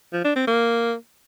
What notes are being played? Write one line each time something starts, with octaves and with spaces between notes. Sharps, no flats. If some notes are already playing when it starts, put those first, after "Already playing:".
F3
D4
C4
A#3